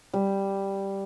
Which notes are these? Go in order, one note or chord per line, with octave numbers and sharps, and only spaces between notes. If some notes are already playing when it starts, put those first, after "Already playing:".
G3